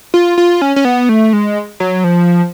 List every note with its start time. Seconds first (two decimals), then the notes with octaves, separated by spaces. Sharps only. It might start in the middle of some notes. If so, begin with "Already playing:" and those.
0.14 F4
0.38 F4
0.62 C#4
0.76 C#4
0.85 B3
1.09 A3
1.33 G#3
1.80 F#3
2.04 F3